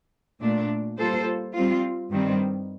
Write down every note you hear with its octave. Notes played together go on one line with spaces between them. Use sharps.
A#2 A3 D4
G3 A#3 F4 A4 C5
G3 C4 F4
G2 D#3 G3 C4